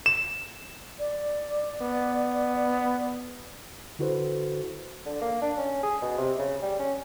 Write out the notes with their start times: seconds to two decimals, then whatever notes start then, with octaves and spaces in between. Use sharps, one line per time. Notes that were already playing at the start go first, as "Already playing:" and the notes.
0.06 E7
0.99 D5
1.82 B3
3.99 D3 E4 F#4 A4 B4 C5
5.06 D3
5.21 A#3
5.42 D4
5.57 C#4
5.83 G#4
6.02 B2
6.18 C3
6.39 C#3
6.62 G3
6.80 C#4